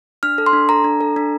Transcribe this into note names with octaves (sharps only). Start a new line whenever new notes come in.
D4 F6
A4
C6
D4
A4 A#5
D4
A4
D4